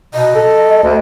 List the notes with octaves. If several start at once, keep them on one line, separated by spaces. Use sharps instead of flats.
B2 D#5
A4
D2